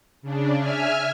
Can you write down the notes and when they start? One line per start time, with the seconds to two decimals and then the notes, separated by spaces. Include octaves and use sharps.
0.22 C#3 D4
0.58 E5 G#5 F6